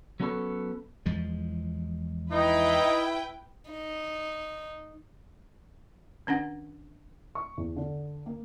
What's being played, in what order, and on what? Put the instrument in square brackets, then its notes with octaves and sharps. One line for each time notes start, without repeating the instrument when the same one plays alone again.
[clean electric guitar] F#3 B3 C#4 A4 B4 C#5
[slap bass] E2 F3 G#3
[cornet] D#4 [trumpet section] E4 [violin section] B4 G5
[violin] D#4
[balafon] D#3 C#4 D4 F#5
[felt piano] C#6
E2
D3
A#3